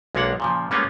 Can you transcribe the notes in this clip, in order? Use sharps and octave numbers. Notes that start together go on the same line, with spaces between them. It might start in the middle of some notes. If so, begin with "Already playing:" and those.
B1 G#3 A#3 D4 C#5 F#5
A#2 C#3 F3
G3 G#3 A#3 B3 C#4 F4